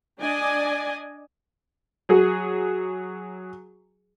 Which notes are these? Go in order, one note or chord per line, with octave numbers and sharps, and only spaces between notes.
D4 D5 D#5 G#5
F#3 F#4 G#4